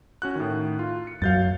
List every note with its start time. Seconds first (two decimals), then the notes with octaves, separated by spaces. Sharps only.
0.22 C#4 F#4 F#6
0.36 A2 D#3
0.79 F4
1.07 C#7
1.22 F#2 F#3 F5 G6 A6